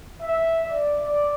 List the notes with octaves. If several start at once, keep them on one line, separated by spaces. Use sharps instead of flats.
E5
D5